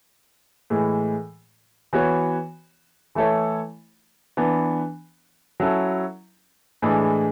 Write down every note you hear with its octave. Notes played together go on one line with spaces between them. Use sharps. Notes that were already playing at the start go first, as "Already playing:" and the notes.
A2 E3 G#3
E3 B3 F#4 C#5
E3 A3 E4 A4 C#5
E3 B3 D4
F#3 C#4 E4 A4
A2 E3 G#3 D4 G#4